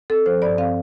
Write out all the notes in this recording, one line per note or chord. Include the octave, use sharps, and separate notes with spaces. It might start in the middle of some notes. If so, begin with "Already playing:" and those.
C4 A4
F3 C5
G2 D5
C4 F5